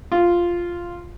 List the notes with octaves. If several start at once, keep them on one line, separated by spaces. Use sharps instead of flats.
F4